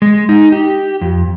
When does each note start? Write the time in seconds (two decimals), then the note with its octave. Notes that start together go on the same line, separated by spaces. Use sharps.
0.02 G#3
0.29 D#4
0.52 G4
1.01 F2